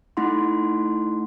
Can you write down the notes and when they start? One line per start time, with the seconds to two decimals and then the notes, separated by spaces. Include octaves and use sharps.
0.17 A3 D#4 E4 F#5 C6